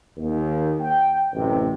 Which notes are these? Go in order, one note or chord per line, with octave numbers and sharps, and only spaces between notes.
D#2
G5
A1 F#2 C3